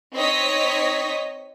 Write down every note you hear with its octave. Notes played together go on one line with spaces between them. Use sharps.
C4 D#4 C#5 D#5 B6